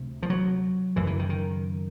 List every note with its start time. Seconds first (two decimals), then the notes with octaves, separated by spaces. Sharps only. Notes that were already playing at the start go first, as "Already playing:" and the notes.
Already playing: D2 C3
0.23 F3
0.30 F#3
0.96 F#2 C#3 E3
1.07 E3
1.19 D#3
1.30 D#3